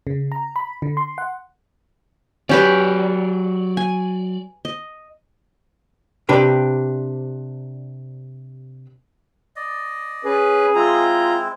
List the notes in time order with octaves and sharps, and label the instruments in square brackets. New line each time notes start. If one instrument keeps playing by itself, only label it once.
[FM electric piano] C#3
A#5
B5
D3
C6
F#5
[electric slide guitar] F#3 D5 [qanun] C#4 G4 B4
[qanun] G#5
D#5
[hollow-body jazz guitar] C3 D4 G4 B4
[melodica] D5 D#5
[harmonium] C#4 B4 [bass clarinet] G#4
[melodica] G#3 C4 E4 [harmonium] F4 A#5